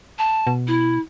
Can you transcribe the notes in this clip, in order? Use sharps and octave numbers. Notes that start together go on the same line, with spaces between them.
A5
B2
E4